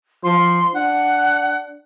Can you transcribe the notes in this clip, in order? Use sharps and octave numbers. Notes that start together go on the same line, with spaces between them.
F3 C6
D4 F#5